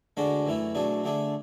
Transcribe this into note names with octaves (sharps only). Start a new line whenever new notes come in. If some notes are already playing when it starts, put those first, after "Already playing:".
D2 D3 G#3 D4 F#4
F#2 E3 A3 E4
B2 F#3 A3 D4 G#4
D3 A3 D4 G#4